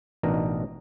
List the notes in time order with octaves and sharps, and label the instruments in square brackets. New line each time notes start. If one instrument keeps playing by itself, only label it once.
[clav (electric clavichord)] A1 B2 D4 D#4 A#4 A#5